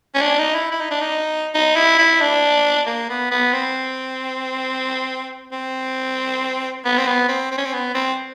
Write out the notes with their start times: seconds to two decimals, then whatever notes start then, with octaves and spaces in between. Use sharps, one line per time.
0.15 C#4
0.22 D4
0.39 D#4
0.55 E4
0.72 E4
0.81 D#4
0.91 D4
1.01 D#4
1.54 D#4
1.76 E4
1.99 E4
2.21 D4
2.86 A#3
3.10 B3
3.31 B3
3.53 C4
5.52 C4
6.85 B3
6.98 C4
7.07 B3
7.28 C4
7.51 C4
7.58 C#4
7.65 C4
7.74 B3
7.95 C4